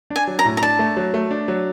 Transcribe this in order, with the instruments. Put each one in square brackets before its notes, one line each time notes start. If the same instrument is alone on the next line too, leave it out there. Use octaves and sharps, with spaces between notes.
[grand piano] D4
[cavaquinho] G#5
[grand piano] F#3
[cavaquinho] A#5
[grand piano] A2
[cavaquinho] A#5
[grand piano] D4 [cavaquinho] A5
[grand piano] A3
F#3
A3
D4
F#3